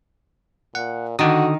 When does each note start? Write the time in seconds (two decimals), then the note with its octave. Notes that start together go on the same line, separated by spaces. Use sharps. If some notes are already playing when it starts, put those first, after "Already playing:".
0.75 A#2 F#5
1.19 D3 D#3 D#4 F#4 D#6